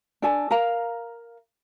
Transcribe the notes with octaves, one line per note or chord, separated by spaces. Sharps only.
D4 A4 G#5
A#4 F5 A#5